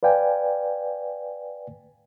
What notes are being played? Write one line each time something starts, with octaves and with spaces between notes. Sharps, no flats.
B4 D5 F5 G5 G#5